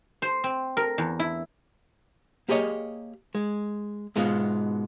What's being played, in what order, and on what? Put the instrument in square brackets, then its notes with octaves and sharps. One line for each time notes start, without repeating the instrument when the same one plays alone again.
[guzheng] C5
C4
A#4
E2
E4
[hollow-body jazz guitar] A#3 G4 G#4 C#5 D#5
G#3
G#2 B2 G#3 B3 F4